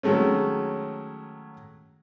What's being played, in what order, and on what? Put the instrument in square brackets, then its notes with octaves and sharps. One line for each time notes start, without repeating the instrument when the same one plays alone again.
[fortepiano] D#3 F#3 G#3 A3 C#4